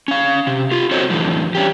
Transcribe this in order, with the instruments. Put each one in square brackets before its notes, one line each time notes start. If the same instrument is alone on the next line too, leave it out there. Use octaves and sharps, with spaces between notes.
[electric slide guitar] C#4 F5
C3
F4 G4
C4 F#4 A4 C5 C#5 D#5
F2 A2 D3 E3 F3
G3 C#4 G4